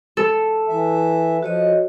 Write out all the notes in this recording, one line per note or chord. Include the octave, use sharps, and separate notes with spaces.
A4
E3 E5
F3 F#4 C#5 D#5